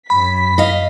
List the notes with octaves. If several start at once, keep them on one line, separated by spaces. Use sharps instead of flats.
F#2 B5 B6
D#5 F5